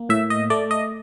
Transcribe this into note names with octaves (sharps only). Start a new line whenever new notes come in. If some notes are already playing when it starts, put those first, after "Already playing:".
Already playing: A#3
A2 E5
D#5
A3 D5
D#5